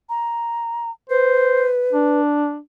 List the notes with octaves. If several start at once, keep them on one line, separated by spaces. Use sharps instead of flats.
A#5
B4 C5
D4